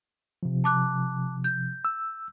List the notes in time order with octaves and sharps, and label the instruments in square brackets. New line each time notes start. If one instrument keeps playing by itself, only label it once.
[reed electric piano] C3 F3
[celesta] A5 D6 F#6
G6
[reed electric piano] E6